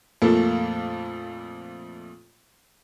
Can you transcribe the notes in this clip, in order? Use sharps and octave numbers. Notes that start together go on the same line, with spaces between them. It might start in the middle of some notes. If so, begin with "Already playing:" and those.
F2 A#2 A3 A#3 A4